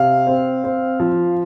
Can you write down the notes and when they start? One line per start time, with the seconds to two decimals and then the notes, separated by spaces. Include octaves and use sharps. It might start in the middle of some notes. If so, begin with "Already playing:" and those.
Already playing: C3 F5
0.27 C4
0.64 C4
1.00 F3